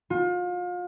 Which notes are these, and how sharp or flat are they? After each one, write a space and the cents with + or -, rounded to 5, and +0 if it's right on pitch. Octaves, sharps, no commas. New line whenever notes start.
F4 +35